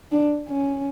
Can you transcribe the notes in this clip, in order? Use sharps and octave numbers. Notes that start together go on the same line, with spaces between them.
D4
C#4